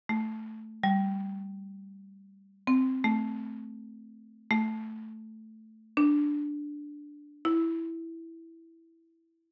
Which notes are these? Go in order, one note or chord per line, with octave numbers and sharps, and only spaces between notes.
A3
G3
C4
A3
A3
D4
E4